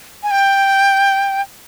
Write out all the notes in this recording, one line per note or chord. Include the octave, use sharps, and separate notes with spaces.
G#5
G5